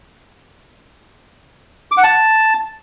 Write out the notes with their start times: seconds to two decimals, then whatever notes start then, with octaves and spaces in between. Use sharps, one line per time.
1.92 D6
1.98 F#5
2.04 A5